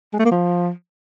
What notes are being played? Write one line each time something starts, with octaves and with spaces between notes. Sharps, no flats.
G#3
A3
A#3
F3